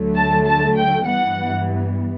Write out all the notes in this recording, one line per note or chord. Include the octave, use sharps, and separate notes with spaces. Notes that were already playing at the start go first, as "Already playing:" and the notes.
Already playing: D2 D3 F#3 A3
A5
A5
G5
G2 E3 G3 B3 F#5